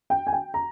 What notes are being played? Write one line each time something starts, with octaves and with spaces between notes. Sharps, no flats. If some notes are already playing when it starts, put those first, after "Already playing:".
G5
G#5
G5
A#5